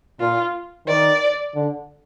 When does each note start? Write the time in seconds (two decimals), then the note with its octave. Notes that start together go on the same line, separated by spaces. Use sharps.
0.20 A#2 F4
0.87 D#3 D5
1.55 D3